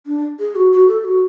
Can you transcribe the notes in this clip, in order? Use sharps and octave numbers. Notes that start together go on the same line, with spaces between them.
D4
G#4
F#4
F#4
A4
F#4